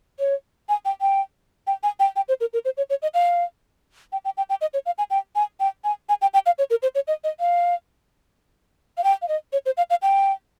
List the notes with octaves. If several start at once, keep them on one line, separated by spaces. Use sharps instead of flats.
C#5
G#5
G5
G5
G5
G#5
G5
G5
C5
A#4
A#4
C5
C#5
C#5
D#5
F5
G5
G5
G5
G5
D#5
C#5
F5
G#5
G5
G#5
G5
G#5
G#5
G5
G5
F5
C#5
A#4
C5
C#5
D#5
D#5
F5
F5
G5
F5
D#5
C#5
C5
F5
F5
G5